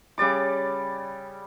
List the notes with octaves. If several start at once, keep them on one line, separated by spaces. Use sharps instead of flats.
C#3 G3 D5 D6